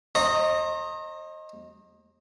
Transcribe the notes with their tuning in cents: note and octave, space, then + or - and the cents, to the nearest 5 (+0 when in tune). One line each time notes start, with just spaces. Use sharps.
C5 +45 D#5 +0 A#5 -20